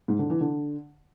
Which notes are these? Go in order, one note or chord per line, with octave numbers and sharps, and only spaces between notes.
G#2
D3
E3
D3